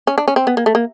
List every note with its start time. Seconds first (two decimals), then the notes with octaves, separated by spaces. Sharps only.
0.07 C#4
0.18 D4
0.28 C#4
0.36 C4
0.47 B3
0.57 A#3
0.66 A3
0.75 A#3